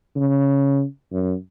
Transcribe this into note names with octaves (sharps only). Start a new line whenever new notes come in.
C#3
F#2